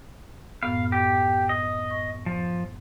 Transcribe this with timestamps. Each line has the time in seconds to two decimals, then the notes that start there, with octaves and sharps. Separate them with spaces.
0.63 F#2 A2 B3 F5
0.92 G4
1.49 D#5
1.90 C#6
2.26 F3